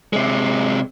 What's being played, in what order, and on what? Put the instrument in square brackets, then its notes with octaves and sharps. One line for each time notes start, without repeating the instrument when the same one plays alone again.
[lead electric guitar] C3 G#3